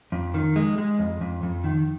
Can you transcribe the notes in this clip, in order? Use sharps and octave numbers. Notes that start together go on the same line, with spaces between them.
F2
D#3
G#3
G#3
F2
F2
F2
D#3